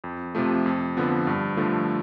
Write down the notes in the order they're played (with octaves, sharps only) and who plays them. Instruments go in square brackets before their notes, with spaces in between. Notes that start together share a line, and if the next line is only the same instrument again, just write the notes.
[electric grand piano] F2
C3 F3 A3
F2
D3 F3 B3
G2
D3 F3 A3